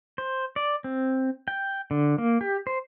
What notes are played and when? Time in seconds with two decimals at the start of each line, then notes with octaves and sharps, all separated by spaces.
0.18 C5
0.56 D5
0.84 C4
1.48 G5
1.91 D3
2.18 A#3
2.41 G4
2.67 C5